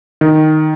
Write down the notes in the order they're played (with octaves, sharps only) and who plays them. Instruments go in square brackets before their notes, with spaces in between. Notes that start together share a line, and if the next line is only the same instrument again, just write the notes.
[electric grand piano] D#3